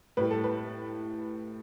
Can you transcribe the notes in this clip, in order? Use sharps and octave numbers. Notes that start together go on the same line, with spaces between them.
A2 G3 B4
A4
B4